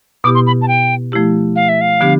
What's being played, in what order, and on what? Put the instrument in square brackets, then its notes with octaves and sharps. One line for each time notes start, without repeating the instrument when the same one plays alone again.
[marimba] B2 B3 E4 G4 [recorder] D6
[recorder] C6
B5
A5
G5
[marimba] F3 A3 E4 G4
[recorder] F5
E5
F5
[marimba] D3 F3 B3 D4 G4